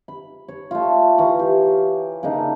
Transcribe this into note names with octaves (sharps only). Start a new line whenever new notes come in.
B5
C#5
A3 F4
E3 F5 A#5 C#6
G4
C#3 A#3 D4 D#4